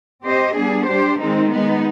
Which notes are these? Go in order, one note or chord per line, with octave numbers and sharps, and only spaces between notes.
C4 G4 C5 D#5
G3 B3 D4 G#4
G3 D4 G4 C5
D#3 G#3 C4 D#4
G#3 B3 D#4